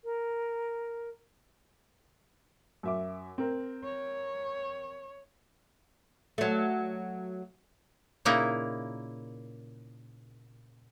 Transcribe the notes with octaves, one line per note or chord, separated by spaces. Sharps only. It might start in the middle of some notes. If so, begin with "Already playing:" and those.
A#4
F#2 E5 D6
C4 A#4
C#5
F#3 A3
A#2 C#3 A#3 D#4 E4